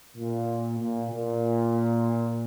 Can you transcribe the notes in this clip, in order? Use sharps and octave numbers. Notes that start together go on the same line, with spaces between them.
A#2
A#2
A#2